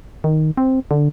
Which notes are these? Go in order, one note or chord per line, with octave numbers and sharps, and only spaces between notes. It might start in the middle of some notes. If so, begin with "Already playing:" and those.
D#3
C4
D3